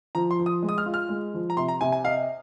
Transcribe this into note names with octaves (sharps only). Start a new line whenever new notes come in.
F3 A#5
C6
F3
D#6
G#3
D#6
F6
F4
F6
G#3
F3
A#5
C3 C6
A#5
C3 G#5
G#5
D#5 F5